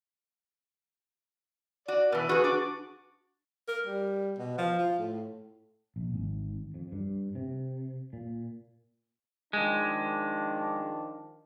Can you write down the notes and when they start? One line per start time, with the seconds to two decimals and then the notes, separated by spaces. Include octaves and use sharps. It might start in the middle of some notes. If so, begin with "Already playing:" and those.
1.88 F#4 D5
2.12 B2 E3 B4
2.29 F#4 G#4
2.44 D4 F#4 D6
3.68 A#4
3.87 G3
4.38 B2
4.58 F3
4.79 F4
4.99 A2
5.96 A#1
6.14 G#1
6.74 F2
6.92 G2
7.35 C3
8.13 A#2
9.53 D#3 F3 G#3 D4